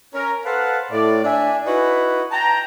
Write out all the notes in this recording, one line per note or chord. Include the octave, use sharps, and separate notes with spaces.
C#4 A#4
A4 B4 C5 F5 F#5 A5
A2 D5
D4 E5 G#5
D#4 E4 F#4 B4
G5 A5 A#5